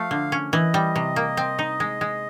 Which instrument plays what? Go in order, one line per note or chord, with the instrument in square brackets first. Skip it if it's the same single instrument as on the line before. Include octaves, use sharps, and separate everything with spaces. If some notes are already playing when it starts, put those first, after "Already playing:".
Already playing: [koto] F3 A3 [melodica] F5
[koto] D3
C#4
[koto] E3 [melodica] D#5
[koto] G3
C3
A#3
C4
D#4
G#3
G#3